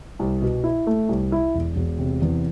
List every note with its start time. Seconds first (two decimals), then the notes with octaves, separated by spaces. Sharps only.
0.19 C2
0.42 B2
0.64 E4
0.87 A3
1.09 C2
1.32 E4
1.55 E1
1.76 E1
1.99 C3
2.22 E2